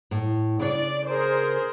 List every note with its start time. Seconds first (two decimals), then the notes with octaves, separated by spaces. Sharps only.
0.11 A2
0.59 C#3 D4 C#5 D5
1.08 G#4 A#4 C5